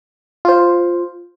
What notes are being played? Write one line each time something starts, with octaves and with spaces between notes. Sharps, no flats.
F4 C5